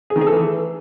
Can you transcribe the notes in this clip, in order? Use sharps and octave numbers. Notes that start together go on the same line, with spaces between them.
G#4
D#3
G#4
A4
E3